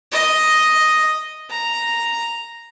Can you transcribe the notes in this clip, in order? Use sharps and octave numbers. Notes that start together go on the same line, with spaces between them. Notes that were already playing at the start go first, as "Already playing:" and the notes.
D#5
A#5